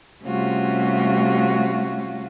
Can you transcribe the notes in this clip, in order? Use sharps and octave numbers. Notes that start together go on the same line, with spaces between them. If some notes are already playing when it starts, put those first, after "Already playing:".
C3 G3 A3 C#4 F4 F#4